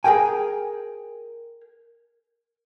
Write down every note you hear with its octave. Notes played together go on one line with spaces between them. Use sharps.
G#4 A#4 G5 G#5